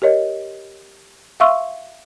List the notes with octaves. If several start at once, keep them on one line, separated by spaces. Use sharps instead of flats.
G4 A#4 C#5 D#5
E5 F5 C6 C#6 E6 F6